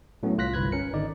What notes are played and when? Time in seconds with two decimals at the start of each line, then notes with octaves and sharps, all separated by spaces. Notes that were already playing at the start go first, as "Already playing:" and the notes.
0.23 A2 F#3 A3 B3 C#4
0.38 C2 F4 F#6 A#6 B6
0.54 G1 C2 B4 F#6 G#6
0.72 C#4 A#4 C#7
0.93 G#1 D3 D#4 D5